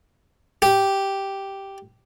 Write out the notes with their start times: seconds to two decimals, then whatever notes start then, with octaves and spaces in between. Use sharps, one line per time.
0.62 G4